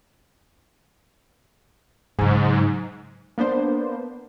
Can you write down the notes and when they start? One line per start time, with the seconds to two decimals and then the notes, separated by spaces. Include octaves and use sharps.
2.19 G#2 C#3 F#3
3.38 A#3 B3 D4 C5